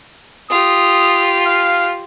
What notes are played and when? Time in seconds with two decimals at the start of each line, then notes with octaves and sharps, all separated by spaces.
0.50 F4 G4 D#6
1.46 F5